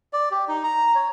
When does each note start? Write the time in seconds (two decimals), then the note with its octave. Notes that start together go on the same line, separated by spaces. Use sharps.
0.13 D5
0.31 G4
0.48 D#4
0.64 A#5
0.95 C#5